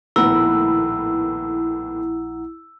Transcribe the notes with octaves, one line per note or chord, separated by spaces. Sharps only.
A#1 D#2 A2 B3 E4 F#5 A#5 E6